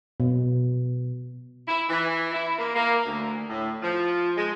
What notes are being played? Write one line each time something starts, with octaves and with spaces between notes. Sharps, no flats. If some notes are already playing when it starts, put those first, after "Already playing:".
B2
E4
E3
E4
A#3
A#3
D2
A2
F3
G#3